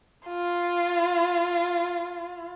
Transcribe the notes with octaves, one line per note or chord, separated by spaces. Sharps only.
F4